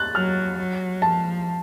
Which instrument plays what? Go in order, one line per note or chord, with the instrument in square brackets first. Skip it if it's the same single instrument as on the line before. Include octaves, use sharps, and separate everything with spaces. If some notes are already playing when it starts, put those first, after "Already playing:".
Already playing: [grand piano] F#6 A6
[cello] F#3 [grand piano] F6
[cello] F#3
[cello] F3 [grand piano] A5